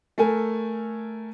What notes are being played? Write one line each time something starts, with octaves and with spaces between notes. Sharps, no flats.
A3 A4 A#4 G#5